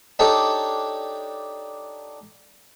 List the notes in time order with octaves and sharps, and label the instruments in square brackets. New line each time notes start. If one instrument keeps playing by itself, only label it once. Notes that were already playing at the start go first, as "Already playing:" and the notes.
[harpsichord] D4 D#4 G4 A4 C#5 D5